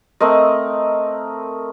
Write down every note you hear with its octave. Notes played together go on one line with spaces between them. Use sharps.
A3 C4 A#4 D#5